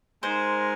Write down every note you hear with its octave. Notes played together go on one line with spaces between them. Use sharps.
G#3 D#4 A#4 C5